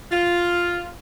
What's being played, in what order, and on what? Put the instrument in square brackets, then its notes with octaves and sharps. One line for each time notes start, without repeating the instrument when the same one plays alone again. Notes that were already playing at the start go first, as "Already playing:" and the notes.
[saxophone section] F4